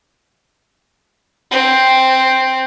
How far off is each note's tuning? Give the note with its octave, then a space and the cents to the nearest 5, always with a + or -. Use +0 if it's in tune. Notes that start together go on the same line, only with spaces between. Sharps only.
C4 +0